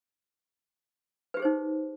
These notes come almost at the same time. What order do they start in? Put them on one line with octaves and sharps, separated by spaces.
B4 G4 G#4 C5 D#4